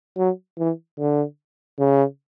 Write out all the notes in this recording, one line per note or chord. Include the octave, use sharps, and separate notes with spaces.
F#3
E3
D3
C#3